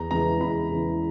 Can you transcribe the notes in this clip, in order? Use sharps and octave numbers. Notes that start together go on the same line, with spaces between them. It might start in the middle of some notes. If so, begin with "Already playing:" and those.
Already playing: E2 A#5
C#3 E3 G#3 A#5
E2 B5
C#3 E3 G#3